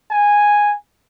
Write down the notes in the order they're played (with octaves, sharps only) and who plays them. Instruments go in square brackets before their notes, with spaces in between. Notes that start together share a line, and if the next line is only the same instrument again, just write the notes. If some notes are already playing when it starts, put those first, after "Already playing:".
[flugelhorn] G#5